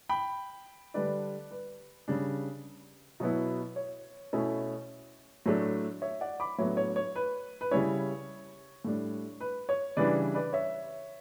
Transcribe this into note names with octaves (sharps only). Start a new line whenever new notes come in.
G5 B5
D3 G3 D4 B4 D5
B4
C#3 G3 D4
B2 F#3 B3 E4
C#5
B2 A3 C#4 E4
A2 F#3 A3 D4
C#5 E5
D5 F#5
B5 D6
A2 F#3 B3 D4 C#5 E5
C#5
C#5
B4
B4
C#3 G3 C#4 E4 C#5
A2 G3 D4
B4
C#5
C#3 E3 G3 D4 B4 D5
B4 D5
C#5 E5